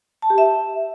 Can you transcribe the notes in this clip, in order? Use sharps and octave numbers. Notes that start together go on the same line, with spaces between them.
A5
G4
E5